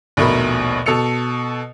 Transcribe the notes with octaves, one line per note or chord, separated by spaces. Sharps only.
A#1 D#2 B2 A3 A#4 B5
B2 A4 E6 C#7 F7